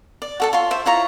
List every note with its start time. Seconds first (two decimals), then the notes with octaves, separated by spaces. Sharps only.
0.22 D5
0.40 F#4 A4 A5
0.53 F4 C#5 C6
0.71 C5 E5
0.86 E4 F4 C#5 A#5